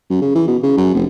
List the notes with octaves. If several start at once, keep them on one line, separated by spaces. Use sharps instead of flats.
F#2
C#3
E3
B2
C#3
F#2
F1